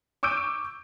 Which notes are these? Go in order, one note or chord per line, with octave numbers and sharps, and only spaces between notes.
C#6 D6 E6 G6 D7 D#7